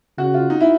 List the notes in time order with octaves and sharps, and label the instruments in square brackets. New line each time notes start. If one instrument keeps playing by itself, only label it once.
[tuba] C#3 [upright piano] F#4
[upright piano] F4
D#4
E4